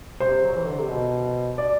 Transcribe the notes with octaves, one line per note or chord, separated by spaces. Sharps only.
C3 C5
F#3
E3
D3
C3
B2
D5